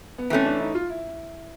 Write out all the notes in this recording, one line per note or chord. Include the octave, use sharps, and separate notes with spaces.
B3
E3 A3 C4 C#4
D4
D#4
F4
E4